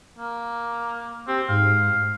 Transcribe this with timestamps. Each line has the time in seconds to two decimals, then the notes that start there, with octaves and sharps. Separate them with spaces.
0.18 A#3
1.27 C4 G4
1.49 G#2 F5